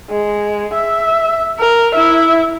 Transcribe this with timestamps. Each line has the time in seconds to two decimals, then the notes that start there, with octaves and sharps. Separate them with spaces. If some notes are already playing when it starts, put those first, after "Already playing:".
0.11 G#3
0.74 E5
1.59 A#4
1.95 E4 E5